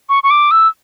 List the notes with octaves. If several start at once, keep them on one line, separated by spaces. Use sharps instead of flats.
C#6
C#6
D6
E6